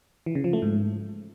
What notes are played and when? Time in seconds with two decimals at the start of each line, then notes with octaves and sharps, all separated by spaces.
0.26 E3
0.35 C#3
0.44 F3
0.53 A3
0.62 G#2